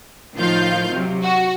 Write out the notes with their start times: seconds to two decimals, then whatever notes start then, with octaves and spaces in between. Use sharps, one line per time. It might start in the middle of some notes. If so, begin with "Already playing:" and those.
0.36 A2 D#3 F3 F4 F5 G6
0.91 C3 F#3
1.24 F#4